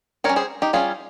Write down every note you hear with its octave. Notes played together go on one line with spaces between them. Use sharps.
G3 A#4 C#5
C#4
G#4 C5
D#4 G4
G3 C#4 F4 G#4